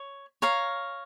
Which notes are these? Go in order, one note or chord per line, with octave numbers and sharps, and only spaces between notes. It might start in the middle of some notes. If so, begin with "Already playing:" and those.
Already playing: C#5
C#5 F5 A#5